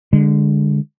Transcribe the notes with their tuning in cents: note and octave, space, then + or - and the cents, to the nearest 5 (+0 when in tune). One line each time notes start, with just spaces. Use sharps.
D3 +0 G#3 -20